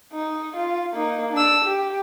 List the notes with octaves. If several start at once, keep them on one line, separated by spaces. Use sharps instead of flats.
D#4
F4
A#3 D#4
D4 E6
G4